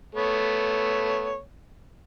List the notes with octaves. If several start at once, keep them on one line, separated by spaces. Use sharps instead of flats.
A3 B3 C#5